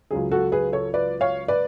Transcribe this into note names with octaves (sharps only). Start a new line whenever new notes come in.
C#2 C#3 F#3 G#4
F#4 A4
G#4 B4
A4 C#5
B4 D5
C#5 F5
B4 D5